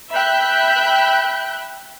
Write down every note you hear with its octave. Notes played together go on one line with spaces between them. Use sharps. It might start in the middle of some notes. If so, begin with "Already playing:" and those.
E5 G5 B5 F#6 G6